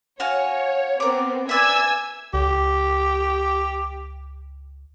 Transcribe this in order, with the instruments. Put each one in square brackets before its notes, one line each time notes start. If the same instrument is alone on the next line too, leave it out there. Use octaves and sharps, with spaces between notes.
[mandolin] F#4 F5 G#5 [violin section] C#5
[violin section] B3 C4 [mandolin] A#4 D6
[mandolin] B4 D5 E5 [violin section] G#5 E6 G#6
[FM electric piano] C#2 [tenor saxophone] G4